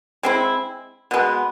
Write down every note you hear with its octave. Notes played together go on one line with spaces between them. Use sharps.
G#3 C4 E4
B2 G#3 B3